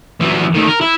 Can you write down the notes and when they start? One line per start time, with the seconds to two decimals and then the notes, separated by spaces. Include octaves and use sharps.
0.21 F#2 E3
0.54 D#3 A3
0.67 A#4
0.81 E4